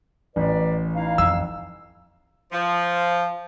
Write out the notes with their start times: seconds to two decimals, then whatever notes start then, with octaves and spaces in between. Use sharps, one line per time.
0.36 A1 B4 D5
0.95 D#4 E4 F5
1.18 F2 E6
2.52 F3